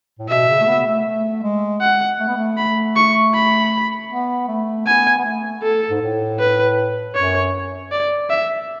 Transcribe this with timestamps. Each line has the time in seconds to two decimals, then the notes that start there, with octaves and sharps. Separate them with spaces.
0.19 A2
0.29 B2 E5
0.49 C#3
0.61 A3
0.67 B3
0.86 A3
1.06 A3
1.43 G#3
1.81 F#5
2.19 A3
2.28 B3
2.37 A3
2.58 B5
2.96 C#6
3.35 B5
4.10 B3
4.48 A3
4.87 B3 G#5
5.18 B3
5.25 A3
5.63 A4
5.91 G#2
6.01 A2
6.39 B4
7.15 F#2 C#5
7.92 D5
8.30 E5